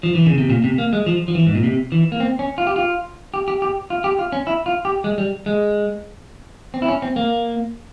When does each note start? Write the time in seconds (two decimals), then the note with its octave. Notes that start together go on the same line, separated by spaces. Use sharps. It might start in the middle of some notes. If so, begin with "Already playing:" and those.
0.03 F3
0.15 E3
0.26 C#3
0.38 C3
0.50 A#2
0.64 C3
0.78 A#3
0.93 G#3
1.06 F3
1.28 F3
1.35 E3
1.47 G#2
1.55 A#2
1.64 C3
1.92 E3
2.12 A#3
2.20 C4
2.39 C#4
2.58 F4
2.67 G4
2.76 F4
3.34 G4
3.48 G4
3.62 G4
3.90 F4
4.04 G4
4.19 F4
4.32 C#4
4.47 E4
4.66 F4
4.85 G4
5.04 G#3
5.18 G3
5.46 G#3
6.74 C4
6.82 E4
6.88 C#4
7.02 C4
7.16 A#3